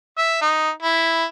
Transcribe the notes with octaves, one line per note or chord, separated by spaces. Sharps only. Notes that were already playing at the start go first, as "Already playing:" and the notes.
E5
D#4
E4